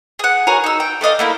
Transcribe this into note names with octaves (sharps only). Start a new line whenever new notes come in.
G#4 F#5
F#4 G#4 A#4 C#5
D#4 E6
G5
A3 D5 D#5 F5
A3 A#3 E4